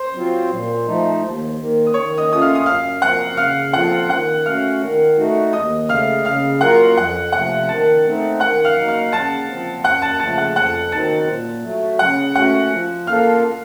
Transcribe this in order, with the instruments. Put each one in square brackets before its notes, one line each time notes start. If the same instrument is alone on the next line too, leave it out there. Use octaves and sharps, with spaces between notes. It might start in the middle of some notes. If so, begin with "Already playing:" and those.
Already playing: [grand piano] C5 C6
[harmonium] F#3 C4 F4
A#2
F3 A3 D#4
D#2
D#3 A#3
[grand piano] D#6
[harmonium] D#3 [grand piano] C#5 C#6
[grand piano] D#5 D#6
[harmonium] A3 C#4 F4 [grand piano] D#6
[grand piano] F5 F6
D#6
[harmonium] F#2 [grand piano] F5 F6
[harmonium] F3 C4 F#4 A#4 [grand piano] F#5 F#6
[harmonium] C#3 [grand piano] F5 F6
[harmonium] F3 C4 F4 A4 [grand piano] F#5 F#6
[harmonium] D#3 [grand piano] F#5 F#6
[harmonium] A3 C#4 F#4 [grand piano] F5 F6
[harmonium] D#3
A3 D#4 F#4
[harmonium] D#2 [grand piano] D#5 D#6
[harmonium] C#3 A3 [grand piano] F5 F6
[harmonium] C#3 [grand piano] F5 F6
[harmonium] F#3 A#3 F4 A#4 [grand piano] F#5 F#6
[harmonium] F2 [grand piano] F#5 F#6
[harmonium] C3 F3 A3 [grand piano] F#5 F#6
[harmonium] D#3 [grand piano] A5 A6
[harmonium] A3 C4 D#4
[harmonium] D#3 [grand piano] F#5 F#6
[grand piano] F5 F6
[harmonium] F#3 A#3 D#4
[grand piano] F5 F6
[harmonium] C#3 [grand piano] A5 A6
[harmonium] F3 C4
[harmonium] F#2 [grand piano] F#5 F#6
[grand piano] A5 A6
[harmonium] C#3 F3 A3 [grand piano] A5 A6
[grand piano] F#5 F#6
[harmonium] F2 [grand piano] F#5 F#6
[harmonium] D#3 F#3 C4 D#4 [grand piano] A5 A6
[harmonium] A#2
F#3 A3
[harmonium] C#3 [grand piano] F#5 F#6
[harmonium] A3 C#4 F#4 [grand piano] F#5 F#6
[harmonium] F3
[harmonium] A#3 F4 A4 [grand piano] F5 F6